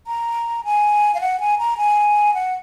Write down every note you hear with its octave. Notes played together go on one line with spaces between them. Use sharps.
A#5
G#5
F5
F#5
G#5
A#5
G#5
F#5